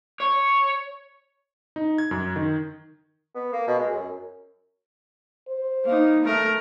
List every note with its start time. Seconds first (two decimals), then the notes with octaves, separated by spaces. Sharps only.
0.20 C#5
1.76 D#4
1.98 G#6
2.11 F#2
2.36 D#3
3.35 B3
3.53 A#3
3.67 B2
3.79 G#3
3.91 F#2
5.48 C5
5.85 A#3 D#4
6.24 A3 A#4